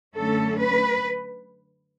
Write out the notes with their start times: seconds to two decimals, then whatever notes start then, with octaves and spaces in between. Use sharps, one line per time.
0.16 F#2 D3 A3 C#4 A4
0.58 B4